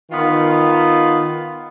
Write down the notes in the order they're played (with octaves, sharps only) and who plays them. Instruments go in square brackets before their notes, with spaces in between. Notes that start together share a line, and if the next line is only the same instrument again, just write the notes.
[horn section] D#3 B3 F4